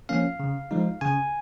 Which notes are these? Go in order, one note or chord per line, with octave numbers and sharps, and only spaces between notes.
F3 A#3 C#4 F5
C#3
F3 G#3 D#4
C#3 G#5